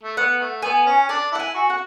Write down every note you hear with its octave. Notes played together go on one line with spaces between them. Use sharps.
A3
B3 F#5
A3
B3 G#5
C#4
D4 A5
E4 F#5
G#5
F#4
F#5